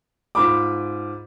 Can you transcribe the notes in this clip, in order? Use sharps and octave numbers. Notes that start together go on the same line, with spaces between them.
G#2 F4 B5 D6